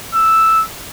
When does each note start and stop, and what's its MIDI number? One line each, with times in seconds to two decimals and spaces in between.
0.14 0.63 88